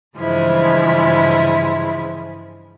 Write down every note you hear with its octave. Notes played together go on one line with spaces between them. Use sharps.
G2 C#3 E3 F3 G#3 E4